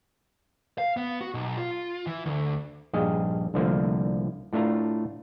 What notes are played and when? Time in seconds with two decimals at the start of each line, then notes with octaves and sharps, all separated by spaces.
0.78 F5
0.97 B3
1.21 F#4
1.34 B1
1.57 F4
2.07 E3
2.25 D2
2.93 A#1 G2 G#4 D#5 F5
3.54 C2 D3 F3 A3 A#3
4.53 A2 A3 D4 F4 A#5